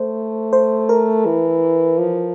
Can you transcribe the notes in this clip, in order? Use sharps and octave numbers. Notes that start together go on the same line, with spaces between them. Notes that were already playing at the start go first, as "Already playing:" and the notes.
Already playing: A3 C5
C5
A#4
E3
F3